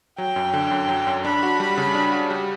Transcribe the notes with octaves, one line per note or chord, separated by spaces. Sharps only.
F#3 G5
F#2
D3
F#2
F#3
F#2
D4 B5
F#4
G3
C#3
D4
F#4
G3